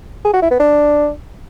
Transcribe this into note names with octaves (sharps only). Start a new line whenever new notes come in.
G#4
F#4
E4
B3
D4